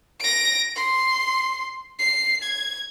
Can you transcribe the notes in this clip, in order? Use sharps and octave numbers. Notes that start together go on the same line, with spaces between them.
A#6 D7
C6
C7
G#6